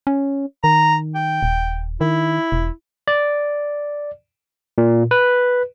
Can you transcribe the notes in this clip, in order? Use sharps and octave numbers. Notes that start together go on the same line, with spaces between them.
C#4
D#3 A#5
G5
D#1
D#3 E4
E1
D5
A#2
B4